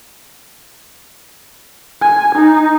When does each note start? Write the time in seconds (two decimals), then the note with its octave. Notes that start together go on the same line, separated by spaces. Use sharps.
2.02 G#5
2.35 D#4